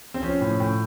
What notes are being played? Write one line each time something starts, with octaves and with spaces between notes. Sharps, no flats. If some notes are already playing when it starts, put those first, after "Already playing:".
C4
F3 C#4
A2
A2